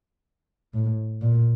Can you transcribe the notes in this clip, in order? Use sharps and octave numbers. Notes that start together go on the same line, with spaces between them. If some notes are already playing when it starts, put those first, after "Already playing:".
A2
A#2